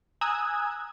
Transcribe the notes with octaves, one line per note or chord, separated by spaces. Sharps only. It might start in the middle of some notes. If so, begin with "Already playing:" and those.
G#5 A#5 D#6 E6 F#6 G#6